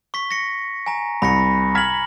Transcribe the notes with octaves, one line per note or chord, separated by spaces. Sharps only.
C#6 B6
A#6 C#7
G#5 A#5
C2 B5 A#6 C#7
A#5 F6 G#6 B6 F#7